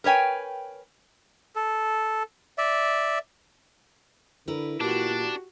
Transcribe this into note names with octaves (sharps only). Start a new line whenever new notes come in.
A#4 B4 C#5 G5 G#5
A4
D5 E5
D3 E4 A#4 B4
A#2 D4 F#4 G4